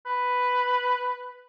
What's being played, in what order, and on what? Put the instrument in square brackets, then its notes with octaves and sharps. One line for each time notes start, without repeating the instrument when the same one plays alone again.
[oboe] B4